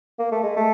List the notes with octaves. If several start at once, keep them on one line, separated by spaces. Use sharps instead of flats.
A#3
A3
G#3
A3